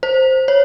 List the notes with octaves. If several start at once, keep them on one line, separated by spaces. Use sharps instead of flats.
C5
C#5